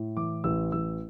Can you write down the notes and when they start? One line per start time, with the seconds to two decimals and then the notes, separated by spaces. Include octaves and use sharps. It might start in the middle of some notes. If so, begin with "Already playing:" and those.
Already playing: A2
0.17 E3 D6
0.44 A1 E6
0.72 A1 E6